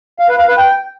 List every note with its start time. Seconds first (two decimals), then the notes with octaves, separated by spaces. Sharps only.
0.19 F5
0.29 B4
0.39 F5
0.48 B4
0.58 G5